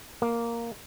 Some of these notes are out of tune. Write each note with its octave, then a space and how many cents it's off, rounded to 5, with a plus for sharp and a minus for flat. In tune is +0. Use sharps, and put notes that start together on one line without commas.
A#3 +0 A#4 +0